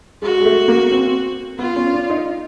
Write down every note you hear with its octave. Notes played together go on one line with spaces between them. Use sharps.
G#3 F#4
G#3
A3
A#3
C4
B3 F4
C#4
D4
D#4